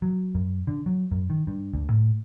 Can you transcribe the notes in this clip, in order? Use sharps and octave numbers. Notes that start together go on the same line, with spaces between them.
F#3
F#2
D3
F#3
F#2
D#3
G2
D2
A2